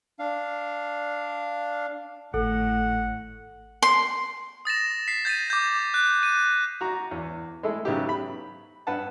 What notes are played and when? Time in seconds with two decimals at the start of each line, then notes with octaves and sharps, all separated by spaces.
0.19 D4 F5
2.34 G#1 A2 A4 F#5
3.82 C6
4.65 D#6 A6 A#6 E7
5.08 B6 C7
5.25 G6 A6 B6 D#7
5.50 D6 G6
5.94 F#6
6.23 D#7
6.81 F#4 A#5
7.11 E2
7.63 G#3 A3 E4 A4
7.85 G#2 C#3 F#3 B3 E4 G4
8.09 B5
8.87 G2 B4 F#5 A5